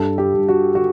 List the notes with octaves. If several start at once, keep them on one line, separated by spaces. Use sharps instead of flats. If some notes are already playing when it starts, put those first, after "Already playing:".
Already playing: G2 A4
G4
G2
F#4
F#4